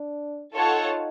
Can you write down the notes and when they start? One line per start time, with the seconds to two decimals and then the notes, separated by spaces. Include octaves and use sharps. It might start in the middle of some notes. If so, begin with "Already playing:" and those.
Already playing: D4
0.54 D#4 F4 A4 C#5 F#5 A5